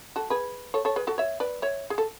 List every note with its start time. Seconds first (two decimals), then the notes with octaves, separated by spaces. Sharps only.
0.16 F#4 A4
0.30 G#4 B4
0.74 A4 C#5
0.85 A4 C#5
0.96 G#4 B4
1.07 F#4 A4
1.18 C#5 E5
1.40 B4 D5
1.62 C#5 E5
1.90 G#4
1.98 A4